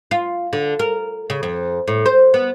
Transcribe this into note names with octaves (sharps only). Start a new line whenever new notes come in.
F4
D3
A#4
C#3
F2
A2
C5
B3